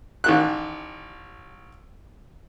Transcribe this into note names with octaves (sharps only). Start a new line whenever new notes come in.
A1 D#3 F#6